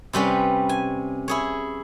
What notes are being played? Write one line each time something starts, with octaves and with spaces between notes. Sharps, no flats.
C3 G3 C#4 B4
G#5
E4 G#4 C#5